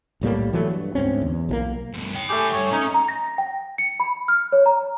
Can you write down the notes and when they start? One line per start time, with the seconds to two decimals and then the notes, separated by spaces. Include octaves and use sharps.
0.21 B1 A2 G3 A#3
0.53 E3 F#3 A3
0.71 G2
0.95 D2 G#2 C4 C#4
1.22 E2
1.49 B1 F3 A#3
1.94 D2 G2
2.15 C#5 G5
2.29 A3 G4 G#4
2.52 G2 C#5
2.72 C#4 D#4
2.94 A#5
3.08 A#6
3.38 G5
3.78 C#7
4.00 B5
4.28 F6
4.52 C#5
4.66 A#5